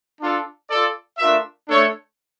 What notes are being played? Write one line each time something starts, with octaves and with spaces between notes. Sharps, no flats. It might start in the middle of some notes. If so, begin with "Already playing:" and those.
D4 F4 A4
F4 A4 D5
A3 D4 F4 A#4 E5
A3 D4 A4 C#5